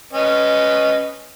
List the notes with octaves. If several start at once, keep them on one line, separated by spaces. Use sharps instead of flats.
C#4 B4 D#5